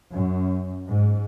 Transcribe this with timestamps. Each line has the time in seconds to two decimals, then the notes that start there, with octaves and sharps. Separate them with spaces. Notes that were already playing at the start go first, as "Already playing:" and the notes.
0.13 F#2
0.86 G#2